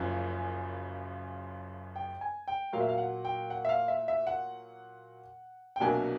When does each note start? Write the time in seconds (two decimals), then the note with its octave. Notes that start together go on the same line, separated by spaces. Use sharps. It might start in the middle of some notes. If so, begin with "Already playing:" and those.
Already playing: F#1 F#2 C#3 F3 G#5
1.96 G5
2.21 G#5
2.48 G5
2.73 A#2 F#3 A#3 F5
2.80 E5
2.89 F5
2.98 F#5
3.25 G5
3.50 F#5
3.65 E5
3.69 F5
3.88 E5
4.08 E5
4.27 F#5
5.76 G5
5.80 C2 B2 F#3 A#3 D4 G#5